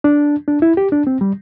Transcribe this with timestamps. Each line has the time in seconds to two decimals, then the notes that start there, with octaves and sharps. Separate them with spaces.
0.04 D4
0.48 D4
0.62 E4
0.77 G4
0.92 D4
1.07 C4
1.21 G3